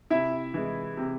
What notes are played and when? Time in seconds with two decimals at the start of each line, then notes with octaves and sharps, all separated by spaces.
0.10 C3 E4 E5
0.54 E3 G#3
0.97 C3